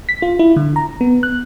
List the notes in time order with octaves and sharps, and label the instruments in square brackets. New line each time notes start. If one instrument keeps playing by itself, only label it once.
[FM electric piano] B6
F4
E4
D3
A#5
B3
F#6